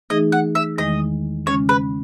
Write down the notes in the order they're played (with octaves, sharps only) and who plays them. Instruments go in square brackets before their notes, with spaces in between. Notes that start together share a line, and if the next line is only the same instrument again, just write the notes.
[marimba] E3 A3 D#4 G#4 [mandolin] D#5
[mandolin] F#5
E5
[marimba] E2 D#3 G#3 [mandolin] D#5
[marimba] C#3 G#3 C#4 [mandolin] C#5
[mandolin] B4